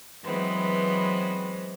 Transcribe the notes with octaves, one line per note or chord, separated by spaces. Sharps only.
E3 F#3 G#3 B3 C4